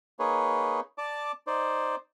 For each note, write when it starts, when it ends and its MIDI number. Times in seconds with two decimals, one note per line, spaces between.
0.19 0.80 58
0.19 0.80 63
0.19 0.80 68
0.19 0.80 71
0.19 0.80 73
0.98 1.32 74
0.98 1.32 81
0.98 1.32 86
1.47 1.96 63
1.47 1.96 72
1.47 1.96 74